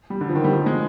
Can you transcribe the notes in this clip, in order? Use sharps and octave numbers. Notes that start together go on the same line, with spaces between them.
G3
D3
F3
D#3
G3
F3
G#3